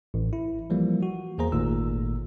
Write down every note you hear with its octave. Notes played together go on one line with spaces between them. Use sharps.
A1
E4
E3 F3 G3 A#3
F#4
E2 A#3 G#4 C5 A#5
G#1 A#2 D#3 A3 E6